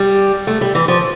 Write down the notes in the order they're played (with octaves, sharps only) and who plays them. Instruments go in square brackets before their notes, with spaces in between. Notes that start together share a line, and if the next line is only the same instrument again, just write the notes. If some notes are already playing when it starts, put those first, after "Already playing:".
Already playing: [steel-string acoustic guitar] G3
A3
G3
E3
F3